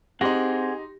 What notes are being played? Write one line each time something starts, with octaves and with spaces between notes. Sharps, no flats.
C4 D#4 G4 G#4 F#5 C6 A#6